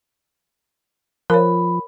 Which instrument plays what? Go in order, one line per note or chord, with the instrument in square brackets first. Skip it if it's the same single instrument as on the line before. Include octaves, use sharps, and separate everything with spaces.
[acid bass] F3 [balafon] A#4 C#5 [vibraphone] B5